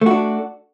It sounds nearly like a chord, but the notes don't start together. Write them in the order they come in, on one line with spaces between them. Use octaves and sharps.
A3 F#4 D4